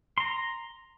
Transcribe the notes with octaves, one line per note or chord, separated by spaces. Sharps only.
A#5 C6